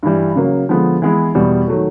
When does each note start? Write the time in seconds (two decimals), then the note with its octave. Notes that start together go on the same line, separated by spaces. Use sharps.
0.03 G2 E3 G3
0.36 C#3 F#3 A#3
0.69 D3 F3 G#3 B3
1.02 E3 G#3 B3 E4
1.35 E2 B2 G3 B3
1.68 D#3 F#3 A3